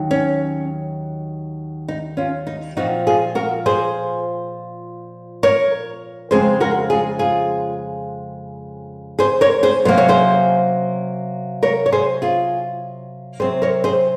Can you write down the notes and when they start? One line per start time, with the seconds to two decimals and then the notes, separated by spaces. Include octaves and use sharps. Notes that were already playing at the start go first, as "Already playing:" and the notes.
Already playing: D#2 D#3 F#3
0.11 C#4
1.88 D#4
2.17 C#4 F4
2.47 D#4
2.77 A#2 F3 C4 D#4 F#4
3.07 F4 G#4
3.35 F#4 A#4
3.66 G#4 C5
5.43 A#4 C#5
6.31 F2 C#3 G#3 C4 G#4 C5
6.60 F#4 A#4
6.90 F4 G#4
7.19 F4 G#4
9.19 G#4 C5
9.41 A#4 C#5
9.63 G#4 C5
9.85 C3 F#3 A#3 C#4 C5
9.98 C#5
10.09 G#4 C5
11.63 A#4 C#5
11.86 C#5
11.92 G#4 C5
12.22 F4 G#4
13.40 C3 F#3 C4 G#4 C5
13.62 A#4 C#5
13.84 G#4 C5